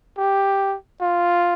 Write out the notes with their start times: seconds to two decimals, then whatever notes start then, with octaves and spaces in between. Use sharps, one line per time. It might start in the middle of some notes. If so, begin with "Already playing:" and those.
0.17 G4
1.01 F4